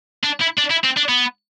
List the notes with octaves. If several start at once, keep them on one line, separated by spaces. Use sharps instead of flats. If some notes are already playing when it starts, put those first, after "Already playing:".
D4
E4
D4
E4
C4
D4
B3